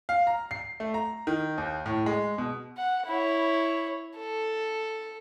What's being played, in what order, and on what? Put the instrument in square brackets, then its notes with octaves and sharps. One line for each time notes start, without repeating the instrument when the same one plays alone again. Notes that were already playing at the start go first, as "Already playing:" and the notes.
[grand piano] F5
A#5
C7
A3
A#5
D#3
D#2
A2
G#3
B2
[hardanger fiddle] F#5
E4 C#5
A4